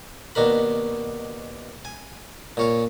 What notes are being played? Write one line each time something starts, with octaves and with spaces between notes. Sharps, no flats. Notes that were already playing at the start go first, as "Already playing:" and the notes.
D#2 B2 D4 A#4 B5
G#5
A#2 C#5 F5